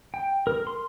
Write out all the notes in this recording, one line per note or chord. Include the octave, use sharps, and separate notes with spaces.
G5
A#4
C6